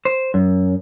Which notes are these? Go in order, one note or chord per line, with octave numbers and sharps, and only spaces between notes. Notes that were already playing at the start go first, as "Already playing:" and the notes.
C5
F#2